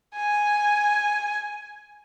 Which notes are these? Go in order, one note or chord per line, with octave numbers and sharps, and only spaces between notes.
G#5